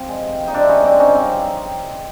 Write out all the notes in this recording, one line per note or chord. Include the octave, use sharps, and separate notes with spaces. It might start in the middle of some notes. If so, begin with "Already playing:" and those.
Already playing: F3 C4
G#3
C3
F3
D#4
C3 C4 D4
E4
G#3 C#4 D#4
C3 C4 D4
F3 C#4 D#4
G2 C4